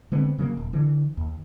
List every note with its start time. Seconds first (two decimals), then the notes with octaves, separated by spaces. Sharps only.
0.12 D3 G#3 B3 C4
0.38 C#3 F#3 A3 A#3
0.57 D#1
0.73 D3 E3
1.17 D#2